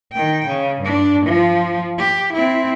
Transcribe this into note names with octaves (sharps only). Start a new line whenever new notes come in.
D#3 G5
C#3
G2 D4
F3
G4
C4 E4